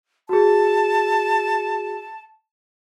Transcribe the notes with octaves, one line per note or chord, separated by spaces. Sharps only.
F#4 G#4 A5